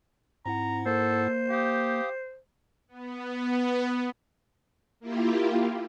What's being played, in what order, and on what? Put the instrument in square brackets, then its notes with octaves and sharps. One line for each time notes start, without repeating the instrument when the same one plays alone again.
[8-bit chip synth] G#2 E4 F#5 [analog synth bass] C4 [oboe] A#5
[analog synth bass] A#3 [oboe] A4 [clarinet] C5
[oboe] G4 [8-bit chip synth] F5 D#6
[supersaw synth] B3
[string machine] A#3 E4 F4 G4